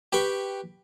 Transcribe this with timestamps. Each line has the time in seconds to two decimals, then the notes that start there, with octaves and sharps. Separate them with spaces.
0.12 G4 B4 G5 B5 C#6